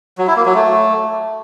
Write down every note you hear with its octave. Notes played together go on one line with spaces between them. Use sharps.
F#3
E4
A#3
F#3
A3